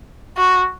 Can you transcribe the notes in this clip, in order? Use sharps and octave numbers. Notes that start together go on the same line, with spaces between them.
F#4